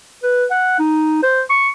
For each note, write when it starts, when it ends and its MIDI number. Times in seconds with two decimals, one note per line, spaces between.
0.23 0.45 71
0.51 0.77 78
0.79 1.22 63
1.23 1.43 72
1.50 1.68 85